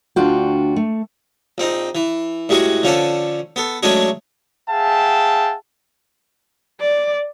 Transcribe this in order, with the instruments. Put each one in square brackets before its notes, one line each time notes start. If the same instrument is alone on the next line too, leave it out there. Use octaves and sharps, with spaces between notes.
[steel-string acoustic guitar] D2 D4 F4 F#4 F5 G5
A3
[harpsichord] A#1 C4 D#4
E3
A2 G3 G#3 F#4 G#4
D3 F3 C#4 D4 A4
B3 A4
F#3 G#3 A3 C#4 D4 G#4
[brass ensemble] G#4 E5 F5 G5 A5
[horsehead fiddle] D5